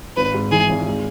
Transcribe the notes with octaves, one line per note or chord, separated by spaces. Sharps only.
G#1 B4
G#2
E3 G#4
G#1
G#3